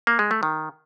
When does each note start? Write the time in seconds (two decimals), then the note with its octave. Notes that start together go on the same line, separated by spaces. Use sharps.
0.07 A#3
0.19 G#3
0.31 A3
0.43 D#3